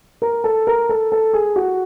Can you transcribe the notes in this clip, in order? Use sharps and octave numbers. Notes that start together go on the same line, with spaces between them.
A#4
A4
A#4
A4
A4
G#4
F#4